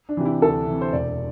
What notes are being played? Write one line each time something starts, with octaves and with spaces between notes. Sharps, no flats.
D4
C3 E3 G4
E4
D2 A4
C3 E3
C5
E1 D5